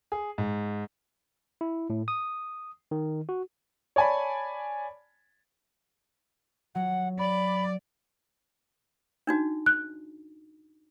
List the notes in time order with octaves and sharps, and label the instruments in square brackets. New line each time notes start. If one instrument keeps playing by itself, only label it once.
[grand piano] G#4
G#2
[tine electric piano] E4
A2
D#6
D#3
F#4
[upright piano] C#5 D5 G#5 A5 B5
[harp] F#3 [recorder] F#5
[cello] D5 [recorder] B5
[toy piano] D4 D#4 F#4
[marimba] F#6